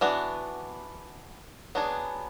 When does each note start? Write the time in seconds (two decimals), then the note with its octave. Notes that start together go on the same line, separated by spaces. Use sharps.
0.01 E3 B3 D4 F#4
1.75 F#3 B3 D4 G#4